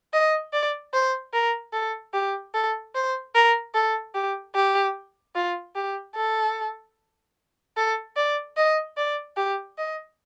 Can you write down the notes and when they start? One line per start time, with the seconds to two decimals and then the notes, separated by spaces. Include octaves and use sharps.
0.13 D#5
0.53 D5
0.93 C5
1.33 A#4
1.73 A4
2.13 G4
2.54 A4
2.95 C5
3.35 A#4
3.74 A4
4.15 G4
4.55 G4
5.35 F4
5.76 G4
6.15 A4
7.77 A4
8.16 D5
8.57 D#5
8.97 D5
9.37 G4
9.78 D#5